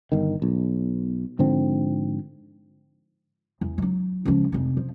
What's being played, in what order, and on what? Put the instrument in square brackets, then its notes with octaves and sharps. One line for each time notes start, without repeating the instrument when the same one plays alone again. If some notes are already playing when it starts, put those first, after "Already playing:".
[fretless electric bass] G1 D#3
B1
G#2 D3 F3 C4
[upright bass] E2
F#3 D#4
C#2 F3
F1 D#4
F3